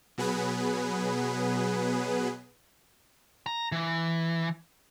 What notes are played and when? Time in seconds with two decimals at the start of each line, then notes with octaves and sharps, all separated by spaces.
0.18 B2 F#3 B3 G#4 B4
3.46 A#5
3.72 E3